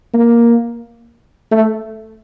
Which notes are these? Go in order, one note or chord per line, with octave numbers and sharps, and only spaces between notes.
A#3
A3